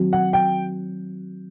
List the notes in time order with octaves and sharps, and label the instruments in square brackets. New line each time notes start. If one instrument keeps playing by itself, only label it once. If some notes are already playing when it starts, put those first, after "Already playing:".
Already playing: [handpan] D#3 F#3 C4 F#4
[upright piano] F#5
G5